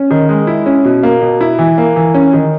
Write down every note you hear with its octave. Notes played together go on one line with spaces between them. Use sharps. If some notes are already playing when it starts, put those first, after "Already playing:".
Already playing: C#4
D#3
G#3
E4
C#4
B2
A#3
B2
E4
E3
A#3
E3
C#4
D#3